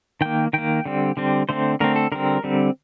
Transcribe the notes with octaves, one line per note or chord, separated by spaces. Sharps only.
D#3 A#3 G5
D#3 A#3 G5
D3 G3 C4
D3 G3 C4
D3 A3 C4 C5
D3 A3 C4 A#4
A4
D3 G3 C4 A#4
D3 G3 C4